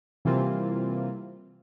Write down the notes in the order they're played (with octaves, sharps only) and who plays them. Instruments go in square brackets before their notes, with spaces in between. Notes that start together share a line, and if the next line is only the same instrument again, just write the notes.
[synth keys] C3 E3 G3 A#3 C4 F4